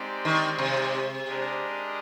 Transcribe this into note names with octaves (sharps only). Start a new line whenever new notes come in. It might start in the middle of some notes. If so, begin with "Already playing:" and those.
Already playing: G#3 C4 D#4 G4 D5
D#3
C3
G#3 D4 G4 A#4 D#5